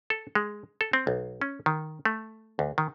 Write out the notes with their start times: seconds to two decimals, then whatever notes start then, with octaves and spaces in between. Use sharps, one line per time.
0.10 A4
0.35 G#3
0.81 A4
0.93 C4
1.07 B1
1.42 C#4
1.66 D#3
2.05 A3
2.59 D2
2.78 D#3